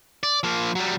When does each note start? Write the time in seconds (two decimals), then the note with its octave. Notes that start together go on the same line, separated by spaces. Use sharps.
0.23 D5
0.44 F3 A#3
0.75 F#3 G3